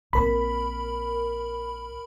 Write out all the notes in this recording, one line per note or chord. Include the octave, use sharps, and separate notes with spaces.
A#1 C4 A#4 B5